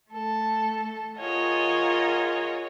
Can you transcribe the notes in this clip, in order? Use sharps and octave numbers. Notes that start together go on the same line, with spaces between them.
A3 A4
F4 G#4 A#4 C#5 D#5 F#5